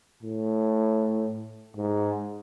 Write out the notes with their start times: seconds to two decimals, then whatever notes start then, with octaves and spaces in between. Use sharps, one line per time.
0.23 A2
1.76 G#2